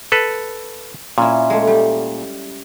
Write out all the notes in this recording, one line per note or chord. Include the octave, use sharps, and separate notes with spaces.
A4 B4
A#2 C#4 E4
G#3 A3
G3